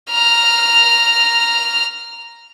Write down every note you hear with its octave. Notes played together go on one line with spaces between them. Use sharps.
A#5 F6